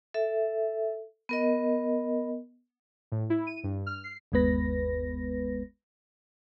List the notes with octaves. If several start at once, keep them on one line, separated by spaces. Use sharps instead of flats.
A4 E5
B3 A#4 D#5
A2
E4
D#7
G2
F6
C7
G1 D#2 G#3 B3 B4 A#6